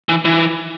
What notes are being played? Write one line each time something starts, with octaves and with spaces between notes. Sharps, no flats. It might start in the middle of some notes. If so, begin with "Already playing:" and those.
E3
E3